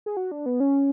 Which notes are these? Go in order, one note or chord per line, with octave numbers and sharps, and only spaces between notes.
G#4
F#4
D4
B3
C#4